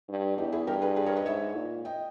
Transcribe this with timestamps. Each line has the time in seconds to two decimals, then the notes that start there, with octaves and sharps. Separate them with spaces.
0.09 G2
0.37 E2 D#4 G4
0.52 E4 G#4
0.67 G2 G4 A#4
0.82 G#4 B4
0.96 G#4 B4
1.06 A#4 C#5
1.16 B4 D#5
1.26 G#2 C#5 E5
1.56 A#2
1.85 D#5 G5